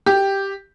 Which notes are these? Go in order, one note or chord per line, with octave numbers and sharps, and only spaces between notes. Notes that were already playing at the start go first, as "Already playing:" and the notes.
G4